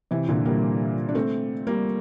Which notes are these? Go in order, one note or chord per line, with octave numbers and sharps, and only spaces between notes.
C3 E3
A#2 D3
G3 A#3
D4
A3 C4
G3 A#3